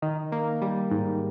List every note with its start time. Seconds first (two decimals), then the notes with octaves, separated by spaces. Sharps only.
0.02 D#3
0.32 A#3
0.62 G3
0.91 G#2